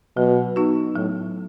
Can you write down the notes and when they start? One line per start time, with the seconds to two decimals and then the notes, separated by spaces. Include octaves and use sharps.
0.17 B2 F#3
0.56 B3 D#4 F#4
0.95 A2 F#3